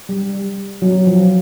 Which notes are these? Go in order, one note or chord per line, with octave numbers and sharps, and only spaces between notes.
G3
F#3
F3